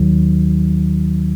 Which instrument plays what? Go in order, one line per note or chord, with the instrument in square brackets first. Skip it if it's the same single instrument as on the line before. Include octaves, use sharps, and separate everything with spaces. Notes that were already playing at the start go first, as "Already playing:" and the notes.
Already playing: [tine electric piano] D#2 D#3 F#3